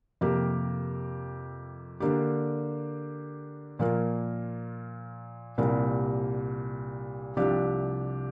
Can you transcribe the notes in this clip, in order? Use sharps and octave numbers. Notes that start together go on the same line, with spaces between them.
F2 C3 A#3 G4 A#4
D3 A#3 D4 G4
A#2 F3 A#3 F4 A#4
C2 A#2 G3 C4 A#4
C2 C3 F3 D4 G4